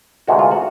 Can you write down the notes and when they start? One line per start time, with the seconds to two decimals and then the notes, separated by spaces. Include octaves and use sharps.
0.27 D2 C3 E3 G#3 F#4
0.39 F4
0.51 F#4